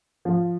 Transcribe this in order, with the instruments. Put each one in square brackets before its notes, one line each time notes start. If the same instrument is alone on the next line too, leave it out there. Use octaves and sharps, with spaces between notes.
[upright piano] F3